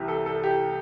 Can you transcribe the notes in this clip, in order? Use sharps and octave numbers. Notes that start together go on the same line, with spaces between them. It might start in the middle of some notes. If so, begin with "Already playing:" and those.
Already playing: C2 C3 E3 G4
A4
A4
G4